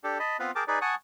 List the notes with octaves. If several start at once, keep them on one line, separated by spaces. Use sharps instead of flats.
D4 G4 A4
D#5 A5 B5
B3 C4 F4 B4
G#4 A#4 G5 A5 D6
D#4 G#4 B4 D5
F#5 G#5 A5 C#6 D#6